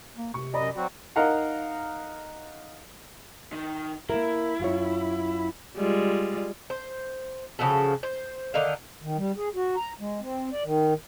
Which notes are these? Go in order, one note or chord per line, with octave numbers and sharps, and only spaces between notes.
A#3
C3 C#6
F#2 D5 D#5 A#5 B5
F#3 C4 F#4
D#4 A#4 F5 F#5 A#5
D#3
A#3 E4 A#4
F#2 F4 C#5
G3 G#3 F4
C5
C#3 F3 F#4 A4
C5
D3 D#3 D#4 F5
D#3
G3
G#4
F#4
A#5
G#3
C4
D5
D#3